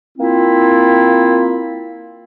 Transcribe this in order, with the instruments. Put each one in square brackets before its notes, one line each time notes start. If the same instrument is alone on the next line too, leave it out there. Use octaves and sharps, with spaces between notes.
[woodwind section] A#3 C4 E4 F4